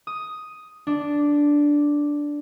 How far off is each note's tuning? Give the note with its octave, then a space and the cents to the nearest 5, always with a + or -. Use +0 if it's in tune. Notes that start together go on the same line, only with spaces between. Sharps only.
D#6 +5
D4 -5